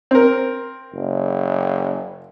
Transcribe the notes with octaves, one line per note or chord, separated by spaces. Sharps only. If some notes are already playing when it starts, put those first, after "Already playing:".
C4 A#4
F#1